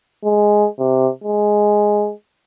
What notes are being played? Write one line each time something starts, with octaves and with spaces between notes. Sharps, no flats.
G#3
C3
G#3